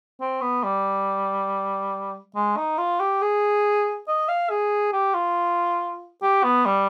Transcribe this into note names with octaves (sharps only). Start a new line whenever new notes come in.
C4
B3
G3
G#3
D#4
F4
G4
G#4
D#5
F5
G#4
G4
F4
G4
B3
G3